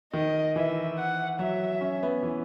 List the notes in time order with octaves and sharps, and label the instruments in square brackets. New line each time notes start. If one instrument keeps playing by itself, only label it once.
[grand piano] D#3 [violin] D#5
[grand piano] E3 [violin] E5
[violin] F#5
[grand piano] F#3 [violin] E5
[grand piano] C#4
B3
E3